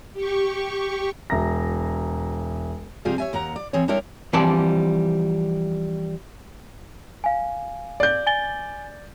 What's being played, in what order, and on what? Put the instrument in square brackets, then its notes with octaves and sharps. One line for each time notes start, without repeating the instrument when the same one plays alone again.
[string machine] G4 C#6
[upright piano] E1 E5 A#5 A#6
[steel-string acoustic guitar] C3 F3 G3 F4 G#4
C#5 E5 G#5
D#2 A#3 F#5 A#5
D5
E3 C4 G#4 C#5
G3 D4 E4 A4 A#4 C#5
[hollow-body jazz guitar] E3 F3 G3 C4 D5 A5
[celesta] F5 G#5
[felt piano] D5 G6
[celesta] G#5 A6 G7